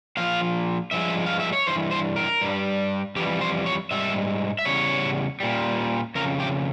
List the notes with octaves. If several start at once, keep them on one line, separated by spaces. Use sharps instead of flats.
A#2 F3 F5
G2 F3 G#3 E5
F5
E5
C#5
G2 E3 C5
C5
A#4
G2 G3
F2 E3 G3 G4
C5
C#5
G#2 G3 E5
E5
E2 C#3 G3 C#5
A#2 G3
F2 C#3 A#4
G4